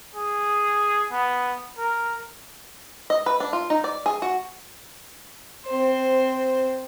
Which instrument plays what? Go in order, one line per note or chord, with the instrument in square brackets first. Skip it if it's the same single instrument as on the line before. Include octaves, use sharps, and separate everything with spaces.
[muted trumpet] G#4
B3
A#4
[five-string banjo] D#5
B4
D4
F4
D#4
D5
G#4
F#4
[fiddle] C4 C5